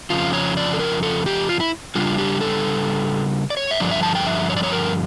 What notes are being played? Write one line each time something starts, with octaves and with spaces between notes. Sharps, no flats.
F2 C#3 F3 F4
C#5
D5
A4
A#4
A4
G4
F4
E4
C#3 G3 D4 F4
G4
A4
D5
C#5
E5
G2 D3 F3 D5
E5
A5
G5
E5
C#5
D5
C#5
A#4